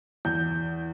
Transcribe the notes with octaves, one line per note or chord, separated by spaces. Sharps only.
E2 G6